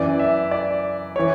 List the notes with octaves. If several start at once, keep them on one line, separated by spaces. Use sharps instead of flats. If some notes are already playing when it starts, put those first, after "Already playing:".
Already playing: F#2 E3 D5
E5
D5
E3 C#5